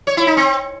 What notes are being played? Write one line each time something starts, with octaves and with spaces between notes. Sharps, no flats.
C#5
E4
D#4
C4